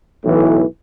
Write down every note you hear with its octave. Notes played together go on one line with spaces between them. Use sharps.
B1 A2 E3